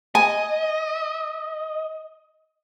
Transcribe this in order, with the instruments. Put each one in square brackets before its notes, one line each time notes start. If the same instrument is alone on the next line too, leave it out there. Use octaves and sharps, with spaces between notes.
[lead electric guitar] D#5 [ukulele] G#5